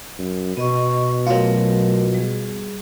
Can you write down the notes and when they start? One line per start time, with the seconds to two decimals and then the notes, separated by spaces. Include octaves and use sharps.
0.19 F#2
0.57 B2 B3 D#5 C#6
1.27 F#3 A3 F4 A#4
2.15 G3 G#4